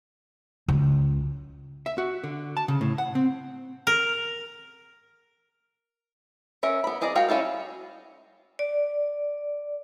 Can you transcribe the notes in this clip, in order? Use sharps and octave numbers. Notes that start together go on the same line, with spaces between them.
C#2
E5
F#4
D3
A5
C#3
A2
F#5
C4
A#4
C#4 A#4 E5
B3 B5
C4 G#4 D5 D#5 A#5
G#3 F#4 A#4 F5 G5
G3 C#4 E4 F4 A4
D5